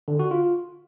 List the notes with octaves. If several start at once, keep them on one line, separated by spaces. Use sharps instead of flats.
D3
F#4
F4